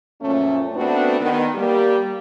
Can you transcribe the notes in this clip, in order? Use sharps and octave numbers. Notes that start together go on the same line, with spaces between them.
F#2 A#2 F3 A3 C#4
A3 B3 C4 D4 F#4 B4
D#3 B3
G3 A#3 G4